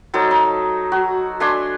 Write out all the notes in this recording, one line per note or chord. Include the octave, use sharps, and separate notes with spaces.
F#3 D#4 A4 C5
D#4
F#4
A3 D4 G#5 C6